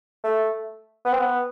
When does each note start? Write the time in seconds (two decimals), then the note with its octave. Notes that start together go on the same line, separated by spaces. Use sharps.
0.24 A3
1.05 B3
1.13 C4
1.20 B3